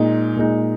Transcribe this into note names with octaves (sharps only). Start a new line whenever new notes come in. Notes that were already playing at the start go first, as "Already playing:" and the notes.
Already playing: A#2 G#3 D#4
A#2 G#3 D#4